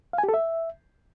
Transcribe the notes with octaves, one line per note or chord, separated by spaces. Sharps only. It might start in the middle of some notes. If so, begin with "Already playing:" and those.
F5
G#5
G4
A4
E5